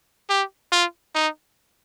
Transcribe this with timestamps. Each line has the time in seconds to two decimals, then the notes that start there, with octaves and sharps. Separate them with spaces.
0.30 G4
0.72 F4
1.15 D#4